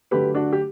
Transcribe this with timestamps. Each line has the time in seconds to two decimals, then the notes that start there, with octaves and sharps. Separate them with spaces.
0.11 D3 F#3 A3 G4 B4
0.35 D4 F#4
0.53 G4